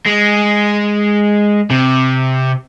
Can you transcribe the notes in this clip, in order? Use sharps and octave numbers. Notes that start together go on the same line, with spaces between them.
G#3
C3